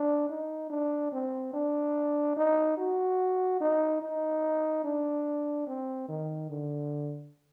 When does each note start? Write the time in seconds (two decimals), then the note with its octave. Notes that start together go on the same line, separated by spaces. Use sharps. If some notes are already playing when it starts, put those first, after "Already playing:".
Already playing: D4
0.29 D#4
0.70 D4
1.12 C4
1.53 D4
2.36 D#4
2.78 F#4
3.61 D#4
4.02 D#4
4.84 D4
5.67 C4
6.08 D#3
6.50 D3